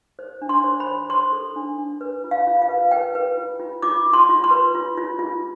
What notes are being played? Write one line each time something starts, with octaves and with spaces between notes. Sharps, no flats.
C5
D4
C6
C5
B5
C5
C5 C6
A4
D4
D4
B4
F4
F5
F4
F5
B4
B4 G5
B4
F4
F4
F4 D6
F4
C6
F4
C6
B4
F4
F4
F4